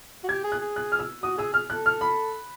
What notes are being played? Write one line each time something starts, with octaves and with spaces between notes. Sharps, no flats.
F#4
G4 G#6
G#4
F#6
G#4
F#6
F6
E6
F#4 D#6
G#4 E6
G#4 F6
A4 F#6
F6
B5